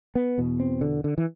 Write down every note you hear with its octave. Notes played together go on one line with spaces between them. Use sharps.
B3
E2 B2
C4
D3
D3
E3